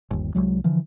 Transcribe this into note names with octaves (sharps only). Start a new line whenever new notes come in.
G1 D#2
C2 G2 F#3 G#3
D3 E3 F3